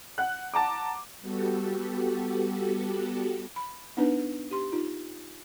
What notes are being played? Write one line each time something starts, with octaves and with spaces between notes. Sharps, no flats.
F#5 F#6
F#5 A5 A#5 D6
G3 B3 F#4 G4 A4
B5
B3 D4 D#4 B4
G4 C6
D#4 F4